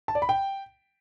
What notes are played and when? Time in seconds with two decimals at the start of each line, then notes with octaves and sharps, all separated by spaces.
0.08 A5
0.15 D5
0.22 B5
0.29 G5